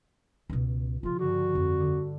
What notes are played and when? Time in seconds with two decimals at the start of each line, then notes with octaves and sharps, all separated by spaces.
0.50 C#2 B2
1.03 C#3 F3 F4
1.19 G2 D3 F#4
1.55 F2
1.80 D3